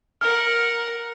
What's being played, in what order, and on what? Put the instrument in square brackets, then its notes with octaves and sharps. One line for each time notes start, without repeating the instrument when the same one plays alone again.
[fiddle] A#4 F#5 [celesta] F6